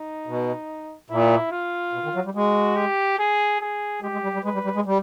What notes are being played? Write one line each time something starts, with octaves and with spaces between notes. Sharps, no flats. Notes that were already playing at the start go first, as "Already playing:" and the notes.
Already playing: D#4
B2
A#2 E4
F4
B2
D#3
F#3
G3
G#3 F#4
G4
G#4
G#4
G#3 G4
G#3
G3
G3
G#3 B4
G3
G3
G#3
G3